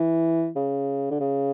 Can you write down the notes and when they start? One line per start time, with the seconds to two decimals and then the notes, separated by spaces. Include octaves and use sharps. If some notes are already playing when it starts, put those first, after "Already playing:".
Already playing: E3
0.56 C#3
1.11 D3
1.20 C#3